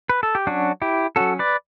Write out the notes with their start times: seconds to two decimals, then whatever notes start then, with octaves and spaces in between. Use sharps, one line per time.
0.09 B4
0.23 A4
0.35 G4
0.47 F#3 C#4 D4 F#4
0.82 E4 G4
1.16 F#3 C#4 F#4 A4
1.39 B4 D5